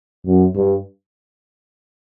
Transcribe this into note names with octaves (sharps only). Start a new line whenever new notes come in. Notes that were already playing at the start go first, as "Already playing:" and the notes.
F#2
G2